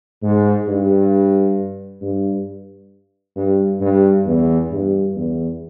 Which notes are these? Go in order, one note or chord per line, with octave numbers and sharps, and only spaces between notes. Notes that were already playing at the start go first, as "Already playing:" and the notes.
G#2
G2
G2
G2
G2
E2
G2
E2